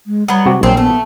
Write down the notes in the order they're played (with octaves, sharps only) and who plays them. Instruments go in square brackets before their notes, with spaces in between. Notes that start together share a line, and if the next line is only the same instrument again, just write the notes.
[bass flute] G#3
[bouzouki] F#3 B3 [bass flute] G3
[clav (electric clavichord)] C3 F#4 G4
[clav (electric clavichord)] A#1 [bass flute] F#3 [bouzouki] C4
[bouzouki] A3 [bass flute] B3